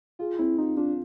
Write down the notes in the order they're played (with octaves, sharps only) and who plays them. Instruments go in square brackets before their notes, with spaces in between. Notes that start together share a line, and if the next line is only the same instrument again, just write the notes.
[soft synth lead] F4 [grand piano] G#4
[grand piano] C4 [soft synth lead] E4
[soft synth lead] D#4 [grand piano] F4
[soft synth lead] D4 [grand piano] F4